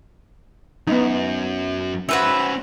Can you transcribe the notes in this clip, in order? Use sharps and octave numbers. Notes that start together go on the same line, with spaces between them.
F#2 B3 D#4
C#4 F#4 B4 C5 E5